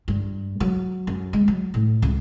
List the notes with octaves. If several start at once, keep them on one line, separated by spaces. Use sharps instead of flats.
G2
F#3
F#2
G#3
F#3
A2
C#2